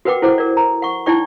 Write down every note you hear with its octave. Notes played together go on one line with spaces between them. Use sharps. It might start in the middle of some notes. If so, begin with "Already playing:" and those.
F#4 A#4 B4 F#5 G5 D6
E4 A4 C5 F#5 D6
A#4 D5
A#5
F#5 C#6
D#4 E4 D5 G5 C#6